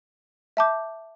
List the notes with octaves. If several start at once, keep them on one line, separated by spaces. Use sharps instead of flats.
E5 A5 D6 G6